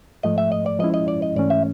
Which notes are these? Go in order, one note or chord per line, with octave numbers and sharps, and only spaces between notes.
G#2 F3 A3 D#5
E5
D#5
D5
F3 G#3 C#4 E4 D#5
D#5
D5
D#5
G#2 E3 A3 C#4 D5
E5